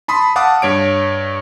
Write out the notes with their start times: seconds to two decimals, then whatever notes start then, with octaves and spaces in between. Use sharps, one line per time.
0.08 A5 B5 C6 D#6
0.36 F5 F#5 A5 D6 D#6
0.62 G2 C#5 D7